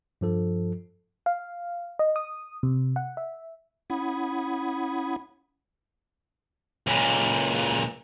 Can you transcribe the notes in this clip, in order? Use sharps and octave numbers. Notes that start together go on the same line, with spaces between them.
G2 F3 A4
F5
D#5
D#6
C3
F#5
E5
C#4 E4 F#5 B5 D#6 G#6
C#2 A#2